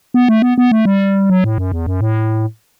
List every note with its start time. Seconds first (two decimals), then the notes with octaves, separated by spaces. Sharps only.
0.14 B3
0.28 A3
0.42 B3
0.58 B3
0.71 A3
0.85 G3
1.30 F#3
1.44 A2
1.58 F#2
1.72 E2
1.87 F#2
2.01 A2